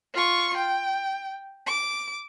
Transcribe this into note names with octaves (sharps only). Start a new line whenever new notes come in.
F4 C#6
G5
D6